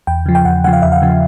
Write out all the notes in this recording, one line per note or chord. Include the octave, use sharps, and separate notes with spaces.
E2 G5
C#3 F3
G5
E2 F#5
C#3 F3 F#5
F5
E2 E5
F5
C#3 F3